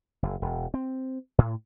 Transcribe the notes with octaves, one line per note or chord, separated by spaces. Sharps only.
F#1
E1
C4
A2